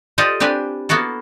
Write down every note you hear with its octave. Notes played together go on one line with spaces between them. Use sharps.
F4 G4 A4 C5 D5 D#5
C4 D4 G4 B4 G#5
A#3 B3 E4 F#4 A4